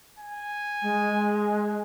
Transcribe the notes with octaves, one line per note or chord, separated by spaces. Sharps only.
G#5
G#3